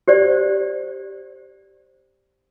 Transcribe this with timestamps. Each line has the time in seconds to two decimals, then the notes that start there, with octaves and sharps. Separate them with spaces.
0.08 G4 C5 D5